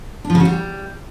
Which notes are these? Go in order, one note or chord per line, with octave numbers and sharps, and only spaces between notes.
D4
F3
C#3
F#4
G3